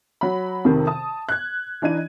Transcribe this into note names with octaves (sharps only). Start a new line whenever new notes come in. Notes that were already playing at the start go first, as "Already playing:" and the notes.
F#3 B5
F2 C3 D#3
A5 D#6
F#6 G#6
E3 D4 D#4 G#6 D#7